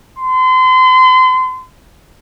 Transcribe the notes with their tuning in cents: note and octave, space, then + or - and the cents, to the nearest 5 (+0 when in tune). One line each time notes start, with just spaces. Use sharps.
C6 -35